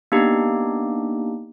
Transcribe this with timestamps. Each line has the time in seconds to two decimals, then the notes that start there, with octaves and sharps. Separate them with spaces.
0.12 A#3 B3 D4 D#4 G4